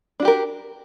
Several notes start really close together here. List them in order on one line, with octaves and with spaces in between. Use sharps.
D4 F#4 G4 A#4